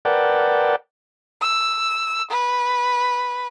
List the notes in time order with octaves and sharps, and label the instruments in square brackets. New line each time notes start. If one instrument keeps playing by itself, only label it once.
[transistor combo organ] A#4 B4 D5 F#5 G5 A5
[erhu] E6
B4